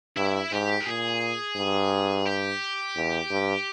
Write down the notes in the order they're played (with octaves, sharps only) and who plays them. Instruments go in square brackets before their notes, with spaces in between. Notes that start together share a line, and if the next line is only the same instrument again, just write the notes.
[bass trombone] G2 [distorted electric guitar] E4
[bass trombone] G#2 [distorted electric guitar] G4
[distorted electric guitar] A#4
[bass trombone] A#2 [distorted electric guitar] G#4
[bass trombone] G2
[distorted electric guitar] G4
[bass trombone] E2
G2